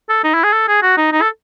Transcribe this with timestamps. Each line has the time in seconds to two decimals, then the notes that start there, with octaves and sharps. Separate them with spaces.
0.09 A4
0.24 D#4
0.33 E4
0.43 G#4
0.53 A4
0.68 G#4
0.82 F#4
0.97 D#4
1.12 D#4
1.21 A4